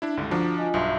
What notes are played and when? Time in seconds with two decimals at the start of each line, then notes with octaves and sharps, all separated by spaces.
0.02 D4 E4
0.17 C#2 G2 D3
0.31 F3 D4 F#4 A#5 D6
0.57 F4 D#5 G#5
0.74 B1 G2 B2 E5 C6